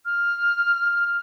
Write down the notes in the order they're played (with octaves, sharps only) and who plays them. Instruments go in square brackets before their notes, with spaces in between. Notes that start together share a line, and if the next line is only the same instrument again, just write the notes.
[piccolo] F6